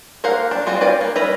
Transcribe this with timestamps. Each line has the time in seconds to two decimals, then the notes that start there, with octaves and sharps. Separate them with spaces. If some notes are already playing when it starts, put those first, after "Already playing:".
0.24 A#3 A#4 C5 F5 F#5
0.51 D4
0.66 G3 C4 F4 F#4
0.81 C#4 B4 D5 F5 G5
1.01 A#3
1.15 G3 C#4 B4 E5 A#5